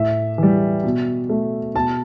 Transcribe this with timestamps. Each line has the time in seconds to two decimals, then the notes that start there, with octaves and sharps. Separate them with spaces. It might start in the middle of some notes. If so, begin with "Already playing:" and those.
Already playing: A2 E5
0.38 E3 G3
0.84 B2
1.29 A3
1.75 B2 A5